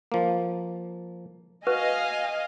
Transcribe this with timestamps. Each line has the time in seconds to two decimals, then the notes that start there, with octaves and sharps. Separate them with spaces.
0.12 F3 A#3
1.67 F#4 B4 D#5 F5 G#5